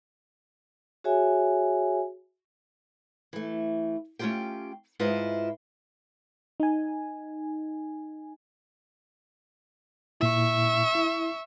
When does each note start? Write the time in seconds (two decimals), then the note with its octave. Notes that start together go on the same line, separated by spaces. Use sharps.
1.04 F#4 G#4 C#5 E5 G#5
3.33 E3 A3
4.19 A3 C#4 D#4 F4 G4 G5
4.99 G#2 E4 F4 B4 D#5
6.60 D#4 G#5
10.21 A#2 E4 E5 C#6
10.95 E4